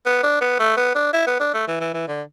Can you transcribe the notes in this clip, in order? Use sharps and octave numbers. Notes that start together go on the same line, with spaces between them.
B3
D4
B3
A3
B3
D4
E4
B3
D4
A3
E3
E3
E3
D3